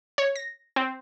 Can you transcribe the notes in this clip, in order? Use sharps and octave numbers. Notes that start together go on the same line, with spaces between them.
C#5
A#6
C4